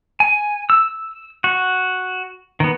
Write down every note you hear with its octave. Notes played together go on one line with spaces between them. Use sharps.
G#5
E6
F#4
D#3 B3